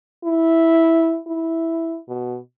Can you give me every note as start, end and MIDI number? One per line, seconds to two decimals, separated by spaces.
0.24 1.19 64
1.28 1.98 64
2.08 2.38 47